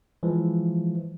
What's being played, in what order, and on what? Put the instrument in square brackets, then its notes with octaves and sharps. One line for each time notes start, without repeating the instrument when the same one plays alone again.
[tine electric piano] E3 F3 G#3